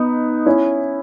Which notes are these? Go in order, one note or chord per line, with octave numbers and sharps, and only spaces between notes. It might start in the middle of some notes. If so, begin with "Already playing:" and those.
Already playing: B3 D#4
C#4 E4